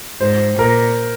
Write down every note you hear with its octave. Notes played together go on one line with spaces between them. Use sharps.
G#2 C5
A#2 A#4